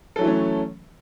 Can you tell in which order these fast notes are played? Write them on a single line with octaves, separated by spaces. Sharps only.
A4 F#3 E3 A3 C#4